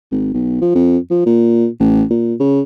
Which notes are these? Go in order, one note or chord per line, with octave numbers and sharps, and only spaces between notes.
G#1
B1
F3
F2
F3
A#2
A1
A#2
C#3